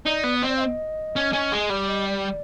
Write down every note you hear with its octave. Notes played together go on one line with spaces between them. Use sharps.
D#4 D5
B3
C4 D#5
D5
F5
D#5
C#4
C#4
G#3
G3 D5
D#5
D5